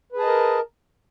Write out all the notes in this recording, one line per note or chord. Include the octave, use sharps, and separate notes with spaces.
G#4 A#4 B4 D#5 A5